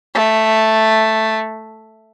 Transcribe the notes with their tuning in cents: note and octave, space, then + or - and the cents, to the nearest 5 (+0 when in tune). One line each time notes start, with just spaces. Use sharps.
A3 +0